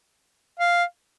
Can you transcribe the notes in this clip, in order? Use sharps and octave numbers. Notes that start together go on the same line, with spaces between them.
F5